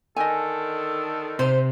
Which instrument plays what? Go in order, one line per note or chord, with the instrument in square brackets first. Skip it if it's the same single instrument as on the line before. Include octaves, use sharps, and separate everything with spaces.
[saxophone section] D3 D#3 A4 [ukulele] D#5 G#5
[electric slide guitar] C3 [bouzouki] C5